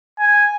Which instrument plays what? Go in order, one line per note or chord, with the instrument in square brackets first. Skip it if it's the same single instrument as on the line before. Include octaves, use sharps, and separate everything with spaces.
[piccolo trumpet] G#5